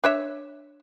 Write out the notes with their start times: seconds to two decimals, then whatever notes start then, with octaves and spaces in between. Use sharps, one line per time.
0.04 D4 C#5 E5